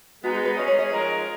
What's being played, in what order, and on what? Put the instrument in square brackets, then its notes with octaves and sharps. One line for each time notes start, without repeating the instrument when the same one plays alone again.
[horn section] G#3 B3 D#4 [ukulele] F#4
[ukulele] G#4
B4
[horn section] G#3 C#4 G#4 [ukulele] D#5
[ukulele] C#5
D#5
[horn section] F3 G#3 D#4 A#4